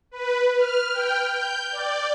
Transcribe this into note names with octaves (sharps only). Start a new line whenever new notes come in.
B4
F6
G5
G6
D5